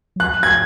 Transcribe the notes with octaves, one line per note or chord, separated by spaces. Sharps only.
F#3
F3 F#6
G#6